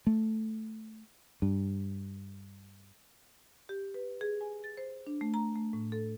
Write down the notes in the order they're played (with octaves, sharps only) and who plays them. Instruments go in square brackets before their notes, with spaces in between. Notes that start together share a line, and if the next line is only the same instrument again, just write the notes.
[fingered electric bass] A3
G2
[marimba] G4
B4
G#4
G#5
A6
C5
D4
A3
A#5
A3
A2
A4